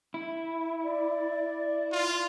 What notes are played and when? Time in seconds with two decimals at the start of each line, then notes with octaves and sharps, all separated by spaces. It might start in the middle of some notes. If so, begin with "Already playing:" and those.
0.14 E4
0.83 D5
1.92 F4